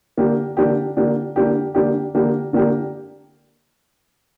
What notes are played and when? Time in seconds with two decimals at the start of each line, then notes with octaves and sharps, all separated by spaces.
0.17 D3 A#3 D4 G4
0.57 D3 A#3 D4 G4
0.97 D3 A#3 D4 G4
1.36 D3 A#3 D4 G4
1.75 D3 A#3 D4 G4
2.15 D3 A#3 D4 G4
2.53 D3 A#3 D4 G4